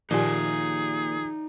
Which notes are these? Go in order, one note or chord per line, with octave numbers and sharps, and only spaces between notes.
A#2 D#3 F3 D#4 G4 G#4 D5 G#5